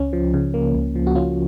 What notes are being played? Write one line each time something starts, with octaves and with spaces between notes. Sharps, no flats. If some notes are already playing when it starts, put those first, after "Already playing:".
Already playing: C#2 C#4
F3
C#3
A#3
C#2
F3
F#4
C#3 C#4 F4